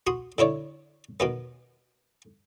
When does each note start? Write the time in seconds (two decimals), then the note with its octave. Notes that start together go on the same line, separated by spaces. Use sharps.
0.07 F#4 C6 D#6
0.38 D3 E4 C#5 D5
1.20 B2 D#3 B3